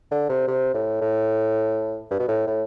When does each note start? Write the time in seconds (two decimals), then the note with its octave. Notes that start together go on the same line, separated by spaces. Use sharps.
0.11 D3
0.29 C3
0.48 C3
0.74 A2
1.01 A2
2.11 G2
2.19 B2
2.28 A2
2.47 A2